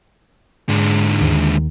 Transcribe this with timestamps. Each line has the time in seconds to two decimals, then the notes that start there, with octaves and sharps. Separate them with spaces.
0.69 G#2 D3 G#3
1.21 D#2